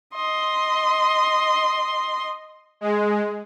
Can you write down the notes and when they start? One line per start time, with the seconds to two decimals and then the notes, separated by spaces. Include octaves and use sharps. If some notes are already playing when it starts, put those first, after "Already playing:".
0.15 D#5 C6
2.81 G#3